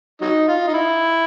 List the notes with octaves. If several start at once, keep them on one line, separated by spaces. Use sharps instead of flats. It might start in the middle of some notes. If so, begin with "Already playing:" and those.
F#3 D#4
F4
D#4
E4